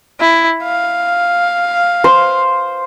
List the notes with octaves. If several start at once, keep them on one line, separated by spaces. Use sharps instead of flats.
E4
F5
C5